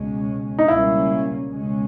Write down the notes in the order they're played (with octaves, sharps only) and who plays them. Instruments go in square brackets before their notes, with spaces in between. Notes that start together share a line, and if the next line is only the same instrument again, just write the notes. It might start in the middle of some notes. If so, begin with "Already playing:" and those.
Already playing: [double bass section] C#2 B2 G#3 C#4
[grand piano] D#4
[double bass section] C#2 B2 G3 A#3 C#4 [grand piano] E4
[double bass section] C#2 B2 G#3 C#4